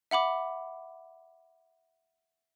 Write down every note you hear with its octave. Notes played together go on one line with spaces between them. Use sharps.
E5 F#5 B5 D6